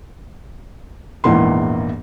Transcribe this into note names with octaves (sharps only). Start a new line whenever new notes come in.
A#1 E2 G#2 E3 A#3 C6